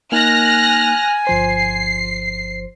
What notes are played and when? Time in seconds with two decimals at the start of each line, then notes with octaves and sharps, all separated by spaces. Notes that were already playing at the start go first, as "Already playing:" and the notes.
0.12 A#3 D#4 G#5 F6 F#6 A#6
1.27 G1 F3 C5 C7